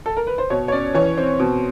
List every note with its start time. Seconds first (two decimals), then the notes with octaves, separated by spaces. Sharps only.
0.06 A4
0.17 A#4
0.27 B4
0.38 C5
0.50 B2 C#5
0.68 C#5
0.72 C#4 D5
0.94 E3 C#5
1.17 C4
1.39 B2